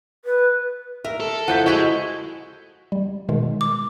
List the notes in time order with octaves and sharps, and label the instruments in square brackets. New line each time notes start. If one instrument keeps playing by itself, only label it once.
[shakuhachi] B4
[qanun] A#4 [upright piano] E5
[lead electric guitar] A4
[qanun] F3 E4 E5 [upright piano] F#5 G6 B6
[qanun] E4 F#4 G#5 [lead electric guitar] G#4 D#5 [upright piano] C#6 B6
[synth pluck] G3
B2 D#3 G#3
[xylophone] D6